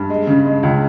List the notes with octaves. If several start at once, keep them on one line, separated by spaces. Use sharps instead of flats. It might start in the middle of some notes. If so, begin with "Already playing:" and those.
Already playing: G2
G#3
C#3
G#3
C#2